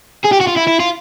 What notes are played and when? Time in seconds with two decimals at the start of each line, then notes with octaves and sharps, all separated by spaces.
0.24 G#4
0.32 G4
0.40 F#4
0.47 F4
0.56 E4
0.67 E4
0.80 F4